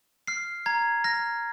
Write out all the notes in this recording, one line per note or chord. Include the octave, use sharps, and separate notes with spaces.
F6 C7
A#5 G#6
F6 A#6